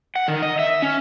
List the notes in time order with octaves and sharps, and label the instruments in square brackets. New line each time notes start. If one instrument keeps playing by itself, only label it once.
[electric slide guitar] F#5
D#3
D#5
E5
C#4